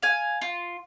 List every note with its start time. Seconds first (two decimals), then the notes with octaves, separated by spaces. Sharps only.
0.02 F5 G#5
0.42 F4